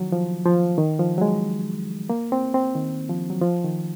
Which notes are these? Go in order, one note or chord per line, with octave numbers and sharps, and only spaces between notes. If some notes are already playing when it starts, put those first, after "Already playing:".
Already playing: D#3 F3 F#3
F3
F3
D#3
F3
F#3
G#3
A#3
C4
C4
D#3
F3
F#3
F3
D#3